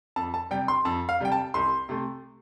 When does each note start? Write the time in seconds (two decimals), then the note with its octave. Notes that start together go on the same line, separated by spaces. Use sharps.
0.16 F2 A5
0.34 A5
0.51 C3 G3 G5
0.68 C6
0.85 F2 A5
1.09 F5
1.20 C3 G3 G5
1.32 A5
1.54 C2 C6
1.89 C3 A3